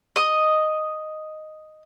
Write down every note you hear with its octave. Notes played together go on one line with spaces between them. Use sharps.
D#5 D#6